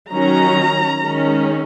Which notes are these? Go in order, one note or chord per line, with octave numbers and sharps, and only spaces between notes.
D#3 F#3 C#4 A#5
D#3 G#3 C#4